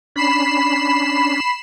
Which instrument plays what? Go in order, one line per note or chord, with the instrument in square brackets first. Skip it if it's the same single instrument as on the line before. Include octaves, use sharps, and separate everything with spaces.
[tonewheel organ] C#4 D4 [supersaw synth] B5 C7 E7